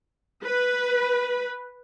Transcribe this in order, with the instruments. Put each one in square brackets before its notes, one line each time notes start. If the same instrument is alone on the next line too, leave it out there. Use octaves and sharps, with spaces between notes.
[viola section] B4